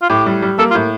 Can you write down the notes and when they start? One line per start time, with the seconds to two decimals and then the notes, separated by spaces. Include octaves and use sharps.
0.02 F4
0.10 A2 G4
0.26 G3
0.42 G3
0.58 A#3 A4
0.71 F4
0.75 A2